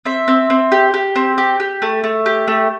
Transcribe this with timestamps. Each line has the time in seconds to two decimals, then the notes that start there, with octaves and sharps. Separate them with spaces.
0.05 C4 E5
0.28 C4
0.50 C4
0.72 G4
0.94 G4
1.16 C4
1.38 G4
1.60 G4
1.82 A3
2.04 A3
2.26 G4
2.48 A3